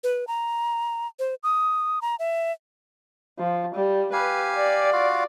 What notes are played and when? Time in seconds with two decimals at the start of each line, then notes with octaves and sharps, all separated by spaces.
0.04 B4
0.28 A#5
1.19 C5
1.43 D#6
2.02 A#5
2.19 E5
3.39 F3
3.75 G3
4.13 G4 B4 F5 G#5
4.56 D5
4.93 F4 F#4 F5